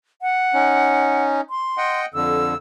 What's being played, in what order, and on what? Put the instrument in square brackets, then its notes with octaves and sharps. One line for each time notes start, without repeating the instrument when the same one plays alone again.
[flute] F#5
[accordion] C#4 D#4
[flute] C6
[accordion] D#5 F#5 G5
[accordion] F2 D3 [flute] E6